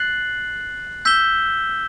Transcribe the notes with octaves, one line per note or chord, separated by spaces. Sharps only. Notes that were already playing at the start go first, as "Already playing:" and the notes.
Already playing: F#6 A6 C7 F#7
E6 G6 B6 E7 G7